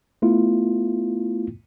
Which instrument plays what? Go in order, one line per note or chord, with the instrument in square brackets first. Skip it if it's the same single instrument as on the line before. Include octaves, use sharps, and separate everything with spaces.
[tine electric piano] A3 B3 E4 F4